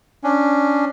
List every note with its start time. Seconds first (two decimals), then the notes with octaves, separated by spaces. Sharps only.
0.24 C#4 D4